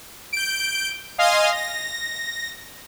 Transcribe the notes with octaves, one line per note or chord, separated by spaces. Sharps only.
G6 D7
D#5 F5 G#5 C6 D#6 F6
A#6